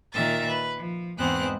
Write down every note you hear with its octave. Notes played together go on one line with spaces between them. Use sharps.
A#2 D#3 A#4 E5 A6
B4
F3
E2 G#2 G#3 B3 C4 F#6